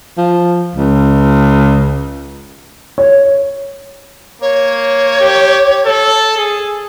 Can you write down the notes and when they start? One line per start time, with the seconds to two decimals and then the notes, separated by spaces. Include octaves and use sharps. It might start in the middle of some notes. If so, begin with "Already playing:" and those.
0.18 F3
0.76 C#2
2.98 C#5
4.42 A#3 C#5
5.20 G4
5.86 A4
6.37 G#4